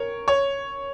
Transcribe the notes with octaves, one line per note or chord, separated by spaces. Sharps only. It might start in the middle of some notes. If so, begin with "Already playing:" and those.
Already playing: A#4 C#5
C#5